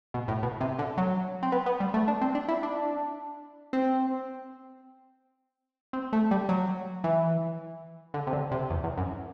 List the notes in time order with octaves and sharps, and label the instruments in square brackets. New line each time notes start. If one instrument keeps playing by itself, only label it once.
[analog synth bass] B2
A2
B2
C3
D3
F#3
C4
B3
B3
G3
A3
D4
C4
D4
E4
D4
C4
C4
A3
G3
F#3
E3
D3
C3
D3
C3
E2
E2
F#2